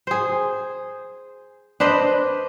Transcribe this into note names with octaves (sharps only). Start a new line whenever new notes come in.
G#4 C5
D4 B4 C5 D#5